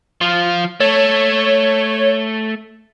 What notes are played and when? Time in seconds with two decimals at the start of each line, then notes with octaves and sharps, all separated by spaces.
0.21 F3 F4
0.80 A3 C#5